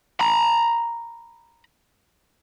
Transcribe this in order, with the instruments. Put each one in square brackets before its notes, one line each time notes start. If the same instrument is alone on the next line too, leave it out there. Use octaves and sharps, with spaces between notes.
[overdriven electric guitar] A#5 B5